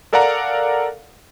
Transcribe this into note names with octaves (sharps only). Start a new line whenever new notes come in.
A4 A#4 D5 F5 F#5 A#5